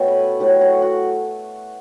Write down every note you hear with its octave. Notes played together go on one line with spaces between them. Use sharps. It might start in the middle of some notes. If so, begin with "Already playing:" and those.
Already playing: B2 A3 E4 G4 A4 C#5
B4
A2 F#3 A3 G4
F#4
F#4